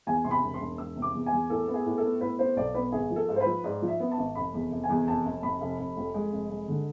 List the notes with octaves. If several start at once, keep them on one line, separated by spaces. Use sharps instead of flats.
E2 G#5
C3 C6
B5
E1
C6
E1
E1 E6
C3
D6
E2
G#5
E2
A2 A4
B3
G#4
A2
A4
B3
A2 B4
B3 C5
B1 D5
B3 B4
G#1 G#4
F3
A4
G#2
C5
B4
F3
G#2 D5
F3
E5
B3
A5
G#1
F1 B5
E2
F1
G#5
E2
F1 A5
F1
C3 B5
F1
F1
F2
G#3
F1
G#3
D3